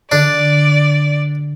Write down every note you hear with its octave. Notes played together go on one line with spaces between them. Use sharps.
D3 D4 D5